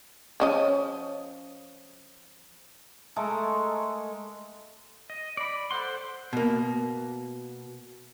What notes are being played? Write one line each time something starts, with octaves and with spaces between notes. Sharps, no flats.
F3 C#4 D#5
G#3 A3 A4 A#4
D#5
D5 B5
A4 C5 F#5 C6
B2 A#3